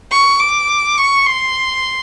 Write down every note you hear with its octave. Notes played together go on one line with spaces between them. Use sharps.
C#6
D6
C#6
C6